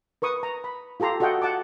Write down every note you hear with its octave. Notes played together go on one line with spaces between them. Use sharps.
A#4 B4 C#6 D#6
A#5
B5
F4 G4 A4 A#5 C6
F#4 A4 D#5 F#5 G5
F#5 A5 D6